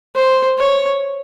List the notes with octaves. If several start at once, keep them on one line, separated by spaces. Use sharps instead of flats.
C5
C#5